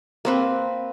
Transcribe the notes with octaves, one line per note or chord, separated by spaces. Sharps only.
A#3 C4 B4